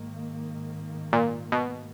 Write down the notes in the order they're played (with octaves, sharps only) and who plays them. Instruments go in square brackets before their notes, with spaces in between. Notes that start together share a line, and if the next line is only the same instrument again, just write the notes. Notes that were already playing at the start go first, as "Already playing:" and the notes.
Already playing: [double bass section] G#2 D#3 A#3
[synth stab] A#2
B2